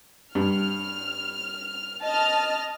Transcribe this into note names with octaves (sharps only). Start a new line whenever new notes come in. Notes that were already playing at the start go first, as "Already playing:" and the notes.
G2 F6
D#5 A5 F6